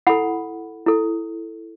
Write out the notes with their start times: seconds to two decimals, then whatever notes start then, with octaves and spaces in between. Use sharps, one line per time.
0.07 E4 A4 F#5 B5
0.86 E4 A4